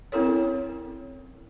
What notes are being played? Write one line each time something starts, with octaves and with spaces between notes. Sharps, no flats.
C4 C#4 E4 A4 A#4 C#5